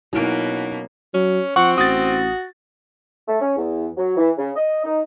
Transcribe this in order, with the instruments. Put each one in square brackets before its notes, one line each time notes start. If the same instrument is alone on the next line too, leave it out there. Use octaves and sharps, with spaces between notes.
[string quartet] B2 A#3 [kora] F#3 C#4 [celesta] D#4 D7 [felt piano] E4
[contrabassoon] F#3 [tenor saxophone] C#4
[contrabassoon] F3 [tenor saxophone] C4 [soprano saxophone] F#5 [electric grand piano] C#6
[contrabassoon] A1 [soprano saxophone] F#4 [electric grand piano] D#6 A6
[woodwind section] A3
C#4
E2
F#3
E3
C#3
D#5
D#4